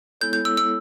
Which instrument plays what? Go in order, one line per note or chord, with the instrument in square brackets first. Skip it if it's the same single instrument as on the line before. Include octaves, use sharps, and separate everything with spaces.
[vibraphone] G#3 B3 E4 A4 C#5 [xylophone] G6
[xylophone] G6
E6
E6